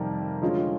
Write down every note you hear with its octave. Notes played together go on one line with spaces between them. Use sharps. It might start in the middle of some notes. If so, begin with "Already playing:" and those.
Already playing: F2 C3 D#3 G3 A#3
D3 F3 G#3 C#4 F4